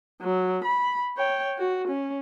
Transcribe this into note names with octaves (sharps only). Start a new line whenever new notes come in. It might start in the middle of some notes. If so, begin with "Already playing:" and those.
F#3
B5
C#5 G5
F#4
C#4